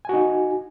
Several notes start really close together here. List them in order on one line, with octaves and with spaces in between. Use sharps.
G#5 F#4 D#4